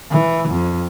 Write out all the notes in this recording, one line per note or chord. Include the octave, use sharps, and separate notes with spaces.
E3
F2